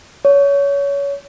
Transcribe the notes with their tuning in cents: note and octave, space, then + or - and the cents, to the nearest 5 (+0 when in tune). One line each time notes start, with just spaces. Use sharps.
C#5 +25